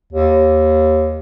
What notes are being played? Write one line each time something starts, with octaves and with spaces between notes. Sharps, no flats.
D#2